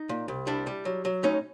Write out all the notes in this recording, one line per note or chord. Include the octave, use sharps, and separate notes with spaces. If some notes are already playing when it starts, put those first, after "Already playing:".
Already playing: D#4
A#2
C2
G3 D4 E4
G3
F#3
F#3
A2 C#4 D#4